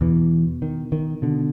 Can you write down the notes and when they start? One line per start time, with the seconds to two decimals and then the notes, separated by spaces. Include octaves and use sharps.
0.01 E2 B2 E3
0.62 D#3
0.92 D#3
1.22 B2 D3